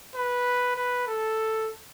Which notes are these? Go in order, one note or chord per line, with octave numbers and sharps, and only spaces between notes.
B4
B4
A4